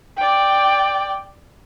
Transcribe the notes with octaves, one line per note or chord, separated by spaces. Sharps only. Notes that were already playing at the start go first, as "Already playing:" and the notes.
D5 G5